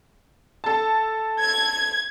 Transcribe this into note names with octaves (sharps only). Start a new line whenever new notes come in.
A4 A5
G#6